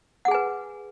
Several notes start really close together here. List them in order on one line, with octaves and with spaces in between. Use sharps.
F#5 G#4 G#5 B4